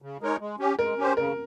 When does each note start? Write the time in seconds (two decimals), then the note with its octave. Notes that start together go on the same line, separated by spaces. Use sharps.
0.02 C#3
0.21 G#3 D#4 A#4 C#5
0.40 G#3
0.59 C#4 G4
0.79 G#3 A#4
0.98 C#4 G4 C5
1.17 C#3 A#4